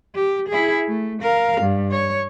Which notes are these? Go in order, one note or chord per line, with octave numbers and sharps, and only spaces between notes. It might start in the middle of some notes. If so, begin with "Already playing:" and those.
G4
E4 G#4
A3
A#4 F5
G2
C#5